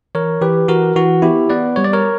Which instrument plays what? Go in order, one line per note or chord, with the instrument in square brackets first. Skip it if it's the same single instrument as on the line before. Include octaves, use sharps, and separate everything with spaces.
[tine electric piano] E3 A#4 C#5
E3 G4 B4
E3 F#4 A#4
E3 F#4
B3 E4 G4
B3 B4 D5
G3 C#5
D5
A#4 C#5